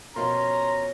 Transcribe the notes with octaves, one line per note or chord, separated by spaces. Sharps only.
B2 F3 C#4 A#4 A#5 C6